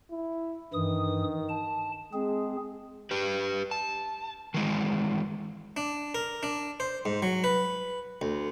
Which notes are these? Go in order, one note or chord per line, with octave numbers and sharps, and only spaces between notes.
E4
G2 D#3 E3 D#6
A5
G#3 C4 G#4
G4 B4
A5
D#3 E3 G#3
D4
A#4
D4
C5
G#2
F#3
B4
D2